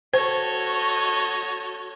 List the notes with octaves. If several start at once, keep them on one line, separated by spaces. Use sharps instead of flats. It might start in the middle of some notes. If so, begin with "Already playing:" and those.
F#4 A4 C5 C#5 D#5